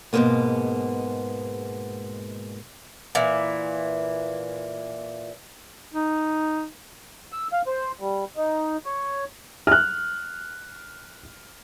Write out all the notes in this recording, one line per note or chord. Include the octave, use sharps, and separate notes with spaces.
G#2 B2 D#3 G#3 A#3 B3
A#2 E3
D#4
E6
F5
C5
G3
D#4
C#5
F6 F#6